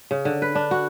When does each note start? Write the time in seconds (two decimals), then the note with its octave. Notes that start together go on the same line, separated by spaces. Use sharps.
0.11 C#3
0.25 D3
0.42 B4
0.55 D4
0.71 F#4